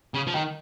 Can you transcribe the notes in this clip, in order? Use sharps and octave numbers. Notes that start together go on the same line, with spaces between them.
C#3
F3
D#3